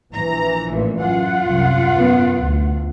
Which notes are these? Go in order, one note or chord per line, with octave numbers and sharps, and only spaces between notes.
A#1 E3 A#5
A1 A#2
F#2 F4 F#5
C2 F#2
F#2 B3
D2